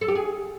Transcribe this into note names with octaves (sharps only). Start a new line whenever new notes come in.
A4
G4
G#4